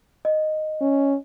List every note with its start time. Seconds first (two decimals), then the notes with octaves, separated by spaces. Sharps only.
0.25 D#5
0.81 C#4